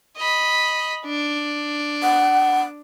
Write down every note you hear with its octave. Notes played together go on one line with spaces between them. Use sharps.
D#5 B5
D4
F#5